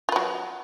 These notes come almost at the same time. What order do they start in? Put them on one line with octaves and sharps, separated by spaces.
F4 B4 F#3